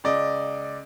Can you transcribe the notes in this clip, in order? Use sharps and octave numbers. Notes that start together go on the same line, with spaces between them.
C#2 D5 D#5